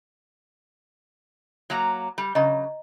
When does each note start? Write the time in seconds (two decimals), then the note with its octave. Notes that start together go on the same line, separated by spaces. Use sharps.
1.70 F#3 A#3 A#5
2.18 G3
2.35 C#3 F#3 D#5 A#5